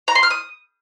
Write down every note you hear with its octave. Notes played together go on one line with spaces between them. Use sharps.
A#5
C6
F6
D#6